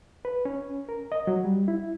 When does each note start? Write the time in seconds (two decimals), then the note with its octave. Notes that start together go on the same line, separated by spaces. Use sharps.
0.25 B4
0.45 C#4
0.89 A#4
1.12 D#5
1.27 F#3
1.45 G3
1.68 E4